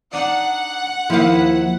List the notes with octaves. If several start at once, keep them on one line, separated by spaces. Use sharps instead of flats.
D4 D#4 F#5
D#2 D#3 F3 E4 F5